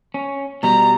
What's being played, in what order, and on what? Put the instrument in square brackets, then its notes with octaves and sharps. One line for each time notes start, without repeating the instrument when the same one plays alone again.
[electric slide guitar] C#4
[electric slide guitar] B2 G3 [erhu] A#5